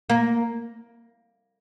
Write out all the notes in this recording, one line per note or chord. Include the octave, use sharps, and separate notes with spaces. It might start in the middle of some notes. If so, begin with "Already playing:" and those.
A#3